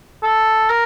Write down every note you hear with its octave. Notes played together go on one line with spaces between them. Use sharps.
A4
A#4